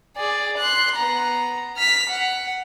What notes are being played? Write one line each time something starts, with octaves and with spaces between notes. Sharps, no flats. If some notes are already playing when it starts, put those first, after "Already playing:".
G#4 D5
C6 F#6
B3 A#5
F6 B6
F#5